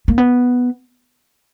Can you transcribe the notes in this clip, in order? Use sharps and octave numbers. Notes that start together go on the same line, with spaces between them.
A#3
B3